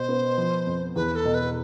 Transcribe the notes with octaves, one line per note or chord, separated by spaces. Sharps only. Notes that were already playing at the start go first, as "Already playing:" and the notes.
Already playing: B2 C5
B3
F3
F2
E2 B4
A4
B2
B4